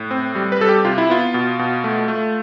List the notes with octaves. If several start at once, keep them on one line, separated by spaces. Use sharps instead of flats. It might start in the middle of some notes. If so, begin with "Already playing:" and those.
Already playing: A2
C4
G3
B4
G3 A4
G4
C3 F4
E4
B3 F4
B2
B2
A3
A3